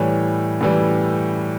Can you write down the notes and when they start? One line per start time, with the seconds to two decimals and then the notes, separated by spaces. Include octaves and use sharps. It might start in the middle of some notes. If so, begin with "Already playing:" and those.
Already playing: A2 E3 G3 C#5
0.61 A2 E3 G3